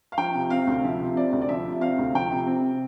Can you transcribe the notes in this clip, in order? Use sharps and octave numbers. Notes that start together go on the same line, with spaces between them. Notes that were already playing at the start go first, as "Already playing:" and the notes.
F5
F3 G5
C3
C4 F5
D2
F3 E5
C3
C4 D5
D2
D5
F3 E5
C3
C4 F5
D2
F3 G5
C3
C4